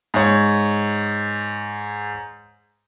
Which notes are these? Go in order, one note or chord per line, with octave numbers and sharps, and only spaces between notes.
G#2 C#5